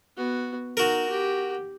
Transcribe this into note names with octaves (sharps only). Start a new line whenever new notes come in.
B3 F#4
D#4 F#4 A#4
G4